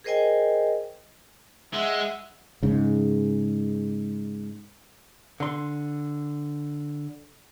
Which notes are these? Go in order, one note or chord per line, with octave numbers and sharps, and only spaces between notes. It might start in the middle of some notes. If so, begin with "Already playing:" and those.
G#4 A#4 C5 D#5 G5 G#5
G#3 E5 F#5
G#2 C#3
D3 C6